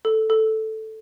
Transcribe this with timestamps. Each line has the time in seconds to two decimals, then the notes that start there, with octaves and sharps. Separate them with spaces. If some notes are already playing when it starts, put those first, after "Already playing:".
0.05 A4
0.30 A4